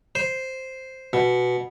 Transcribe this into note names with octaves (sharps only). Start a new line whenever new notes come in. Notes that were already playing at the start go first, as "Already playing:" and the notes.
C5
B2